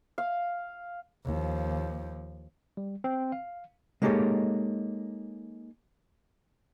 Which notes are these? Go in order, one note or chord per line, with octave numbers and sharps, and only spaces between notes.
F5
D#2 F3
G3
C4
F5
G#3 A#3 D#4 G4 A4 C#5